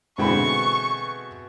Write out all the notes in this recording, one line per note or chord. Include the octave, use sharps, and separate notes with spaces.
G#2 B2 D3 E3 C4 B5 C#6